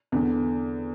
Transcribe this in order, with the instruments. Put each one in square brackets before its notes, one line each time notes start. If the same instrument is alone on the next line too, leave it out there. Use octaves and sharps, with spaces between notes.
[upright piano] E2 D3